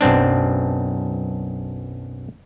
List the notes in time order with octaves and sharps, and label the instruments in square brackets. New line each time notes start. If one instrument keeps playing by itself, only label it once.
[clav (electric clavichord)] B1 F#2 C4 D4